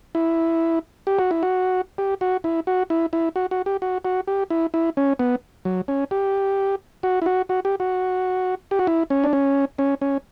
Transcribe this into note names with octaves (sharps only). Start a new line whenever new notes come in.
E4
G4
F#4
E4
F#4
G4
F#4
E4
F#4
E4
E4
F#4
F#4
G4
F#4
F#4
G4
E4
E4
C#4
B3
F#3
C#4
G4
F#4
E4
F#4
F#4
G4
F#4
G4
F#4
E4
C#4
D4
C#4
C#4
C#4